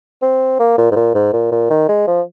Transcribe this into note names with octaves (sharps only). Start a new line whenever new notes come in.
C4
A#3
A#2
G#2
A#2
G#2
A#2
A#2
D#3
G#3
F3